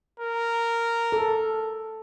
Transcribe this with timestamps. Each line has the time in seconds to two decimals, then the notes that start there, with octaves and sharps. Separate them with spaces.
0.20 A#4
1.12 A4